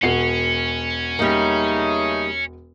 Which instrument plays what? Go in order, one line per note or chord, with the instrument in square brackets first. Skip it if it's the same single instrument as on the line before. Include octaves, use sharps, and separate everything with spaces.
[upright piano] E1 F#4 C7 [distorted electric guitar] C#4
[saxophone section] C#3 A3 D#4 [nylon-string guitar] G3 A#3